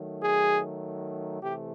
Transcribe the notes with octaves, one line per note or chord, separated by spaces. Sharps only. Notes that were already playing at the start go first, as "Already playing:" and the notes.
Already playing: D#3 F#3 A3
G#4
C3 E3 A3 G4